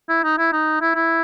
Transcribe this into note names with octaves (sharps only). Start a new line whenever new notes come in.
E4
D#4
E4
D#4
E4
E4